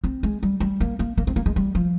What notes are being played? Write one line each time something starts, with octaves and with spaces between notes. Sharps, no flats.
C4
G#3
G3
G3
A#3
A#3
A#3
C4
A#3
G#3
G3
F3